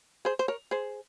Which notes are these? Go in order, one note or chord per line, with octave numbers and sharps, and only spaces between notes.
G#4 C5
C5
A#4 C#5
G#4 C5